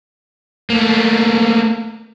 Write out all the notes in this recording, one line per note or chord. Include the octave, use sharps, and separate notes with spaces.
A3 A#3